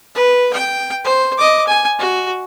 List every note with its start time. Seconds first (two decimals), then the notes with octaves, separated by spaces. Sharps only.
0.15 B4
0.54 G5
1.05 C5
1.38 D#5 D6
1.68 G#5
1.99 F#4